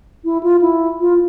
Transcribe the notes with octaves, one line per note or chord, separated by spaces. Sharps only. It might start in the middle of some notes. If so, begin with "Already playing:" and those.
E4
F4
E4
F4